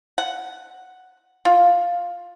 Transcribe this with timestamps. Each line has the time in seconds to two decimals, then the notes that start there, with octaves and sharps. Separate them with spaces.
0.18 F#5
1.45 F4